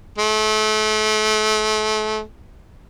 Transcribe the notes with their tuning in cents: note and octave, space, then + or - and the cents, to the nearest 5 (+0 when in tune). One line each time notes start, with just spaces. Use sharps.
A3 -35